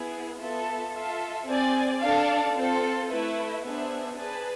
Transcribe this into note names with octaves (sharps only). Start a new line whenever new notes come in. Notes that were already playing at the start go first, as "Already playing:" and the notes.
Already playing: B3 E4 G#4
B3 F4 A4 E5
F4 A4 E5
C4 G#4 D5 G#5
D4 A4 D5 F5 A5
C4 F4 A4
A3 E4 B4 E5
B3 D4 G#4 C5 E5
G#4 B4 D5 A5